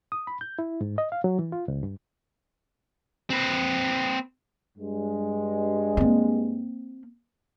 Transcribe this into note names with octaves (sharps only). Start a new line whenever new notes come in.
D#6
B5
G6
E4
G#2
D#5
F5
F#3
E3
F4
C#2
G2
C4 B4
G2 G#3
A#3 C4